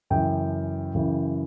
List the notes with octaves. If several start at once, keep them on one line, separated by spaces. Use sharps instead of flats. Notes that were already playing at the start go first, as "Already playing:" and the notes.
F#2 C#3 E3 G5
F#2 C#3 E3